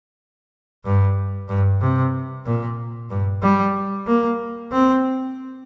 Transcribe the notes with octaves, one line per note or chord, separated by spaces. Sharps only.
G2
G2
C3
A#2
G2
G3
A#3
C4